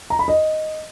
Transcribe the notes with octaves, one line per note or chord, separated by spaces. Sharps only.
A#5
B5
D#5